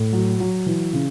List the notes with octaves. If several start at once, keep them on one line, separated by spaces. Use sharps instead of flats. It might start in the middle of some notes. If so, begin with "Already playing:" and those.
Already playing: A2
F#3
F#3
E3
C#3